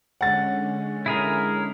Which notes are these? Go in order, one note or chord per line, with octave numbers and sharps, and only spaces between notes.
D3 G#3 C#4 F#5 A6
E4 G#4 A#4